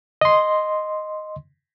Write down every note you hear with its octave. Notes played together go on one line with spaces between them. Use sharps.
D#5 C6